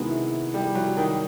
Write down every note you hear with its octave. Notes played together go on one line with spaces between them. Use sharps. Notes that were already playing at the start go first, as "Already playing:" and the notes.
Already playing: C3 D#3 F#3 G#3 B3 E4
G3
F#3
D#3